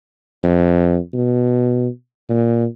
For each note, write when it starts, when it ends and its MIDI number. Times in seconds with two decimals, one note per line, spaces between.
0.43 0.98 41
1.13 1.88 47
2.29 2.65 46